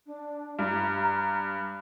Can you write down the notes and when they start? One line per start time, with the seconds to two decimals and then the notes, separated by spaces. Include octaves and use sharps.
0.06 D4
0.59 G2 A#5
1.09 A#5
1.47 B5